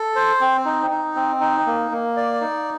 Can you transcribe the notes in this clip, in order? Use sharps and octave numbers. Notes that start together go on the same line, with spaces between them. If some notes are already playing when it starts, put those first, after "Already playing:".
Already playing: A4
C5
C4
D#4
D#4
C4
D#4
A#3
A#3
D5
D#4